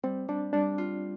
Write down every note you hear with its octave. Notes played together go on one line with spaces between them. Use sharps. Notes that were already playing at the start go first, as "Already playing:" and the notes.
G3 C4
G3 D4
G3 D4
F4